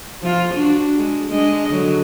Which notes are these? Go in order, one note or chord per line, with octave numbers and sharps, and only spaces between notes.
F3 F4
D4 F#4
G#3
G#3 D4 D#5
D3 F#3